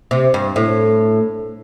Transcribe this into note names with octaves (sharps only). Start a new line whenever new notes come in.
C3
G2
A2